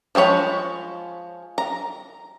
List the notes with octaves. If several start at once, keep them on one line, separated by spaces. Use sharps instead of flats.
F3 G#3 G#4 C#5 B5
A#5